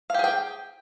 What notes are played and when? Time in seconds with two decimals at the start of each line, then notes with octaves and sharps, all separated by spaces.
0.10 F5
0.14 G4
0.19 G#4
0.24 G5